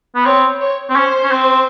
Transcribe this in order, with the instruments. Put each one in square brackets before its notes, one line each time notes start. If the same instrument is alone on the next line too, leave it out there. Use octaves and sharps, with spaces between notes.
[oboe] B3
[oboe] C4 [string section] C#5
[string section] C#5
[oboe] C4
[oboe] C#4 [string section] C5
[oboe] C#4
C4